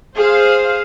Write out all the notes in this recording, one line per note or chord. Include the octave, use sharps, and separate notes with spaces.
G#4 C5 F5